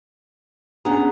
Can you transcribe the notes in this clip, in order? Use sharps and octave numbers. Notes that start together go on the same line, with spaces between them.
B3 C#4 D4 G#4 A#5